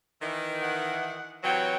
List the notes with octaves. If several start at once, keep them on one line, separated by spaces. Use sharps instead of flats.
D#3 E3
F#5
C3 E3 F#3 G5